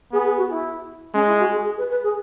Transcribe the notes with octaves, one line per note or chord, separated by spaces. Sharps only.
B3 G#4
G#4
F#4
E4
G#3 C#4
E4
F#4
G#4
G#4
B4
B4
G#4